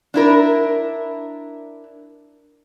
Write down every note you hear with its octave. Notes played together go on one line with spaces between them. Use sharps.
D4 E4 A#4